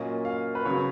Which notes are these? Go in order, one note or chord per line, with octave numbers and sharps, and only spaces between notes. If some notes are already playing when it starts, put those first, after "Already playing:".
Already playing: A#2 F#3 A#3 C#4 D#5
F5
B4
C#3 F#3 B3 C#5